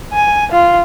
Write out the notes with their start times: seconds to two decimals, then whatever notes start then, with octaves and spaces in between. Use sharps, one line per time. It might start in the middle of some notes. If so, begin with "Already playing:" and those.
0.13 G#5
0.52 F4